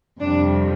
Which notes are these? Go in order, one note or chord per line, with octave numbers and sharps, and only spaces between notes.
F2 C3 G3 D4